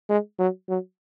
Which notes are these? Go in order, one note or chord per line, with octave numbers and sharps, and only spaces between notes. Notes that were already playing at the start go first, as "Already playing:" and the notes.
G#3
F#3
F#3